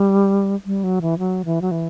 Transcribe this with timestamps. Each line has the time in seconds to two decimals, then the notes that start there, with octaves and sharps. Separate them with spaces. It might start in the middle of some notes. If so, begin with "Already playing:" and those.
Already playing: G3
0.66 G3
0.84 F#3
1.02 E3
1.19 F#3
1.45 E3
1.62 F#3
1.71 E3